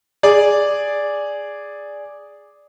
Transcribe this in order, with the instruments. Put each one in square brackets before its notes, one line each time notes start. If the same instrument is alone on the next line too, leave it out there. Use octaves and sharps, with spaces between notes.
[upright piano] G#4 D5